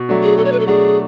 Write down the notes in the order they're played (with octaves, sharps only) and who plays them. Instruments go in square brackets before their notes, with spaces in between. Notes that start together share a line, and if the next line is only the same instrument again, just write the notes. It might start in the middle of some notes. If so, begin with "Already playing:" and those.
Already playing: [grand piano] B2
F#3 A3 D4
[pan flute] G#4
[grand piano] B2 [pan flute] A4
[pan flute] C#5
B4
A4
[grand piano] F#3 A3 D4 [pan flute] G#4